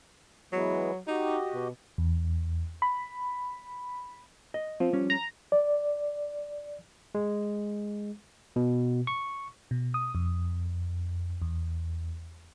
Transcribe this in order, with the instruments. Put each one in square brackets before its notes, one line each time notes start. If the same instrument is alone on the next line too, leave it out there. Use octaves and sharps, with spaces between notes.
[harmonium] E3 G#3 B3 [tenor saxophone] F#3
[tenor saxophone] D#4 [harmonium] F#4 G4 D#5
[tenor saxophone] B2
[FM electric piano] E2
B5
[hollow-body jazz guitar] D#5
[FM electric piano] F3 [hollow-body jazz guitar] C4
[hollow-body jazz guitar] G3 C#4
[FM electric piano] A#5
[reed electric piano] D5
[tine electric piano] G#3
B2
C#6
[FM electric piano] B2
D#6
F2
E2